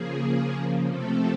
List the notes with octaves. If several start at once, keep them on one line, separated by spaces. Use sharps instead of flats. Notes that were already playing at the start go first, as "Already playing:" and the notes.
Already playing: C#3 F3 A#3 G#4
C3 F3 A3 C4 A4